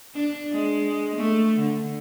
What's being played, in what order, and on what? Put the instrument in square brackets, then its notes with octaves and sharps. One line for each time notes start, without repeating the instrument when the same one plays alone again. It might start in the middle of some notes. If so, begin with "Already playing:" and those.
[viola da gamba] D4
G#3
A3
D3